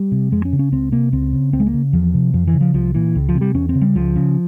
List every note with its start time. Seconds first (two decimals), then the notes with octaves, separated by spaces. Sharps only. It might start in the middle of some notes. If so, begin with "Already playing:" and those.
Already playing: G3
0.12 C3
0.32 F2 G#3
0.45 C#4
0.53 C#3
0.59 C#4
0.72 C#2 C4
0.92 C3 A#3
1.13 C#2 C4
1.33 C#3
1.53 C#2 C4
1.60 G#3
1.67 A#3
1.74 C#3
1.93 E2 F3
2.14 C3
2.33 F2 F3
2.47 E3
2.54 C#3
2.61 F3
2.74 C2 F3
2.95 A#2 E3
3.15 C#2
3.29 F3
3.35 C3
3.41 G3
3.54 E2 C#4
3.69 C4
3.75 C#3
3.81 G3
3.95 C#2 F3
4.16 C#3